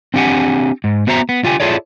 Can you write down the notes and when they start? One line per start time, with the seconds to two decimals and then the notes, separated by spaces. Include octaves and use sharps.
0.14 C4 D4 G4 F#5 G#5
0.84 G#2
1.07 B3 F#4 C5 E5 A#5
1.29 B3
1.44 D3 F4 G4 G#5
1.60 E4 F4 G#4 A4 C#5 D5